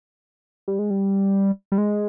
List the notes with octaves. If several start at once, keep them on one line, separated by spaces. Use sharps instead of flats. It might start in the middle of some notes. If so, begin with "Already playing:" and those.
G3
G#3
G3
G3
G#3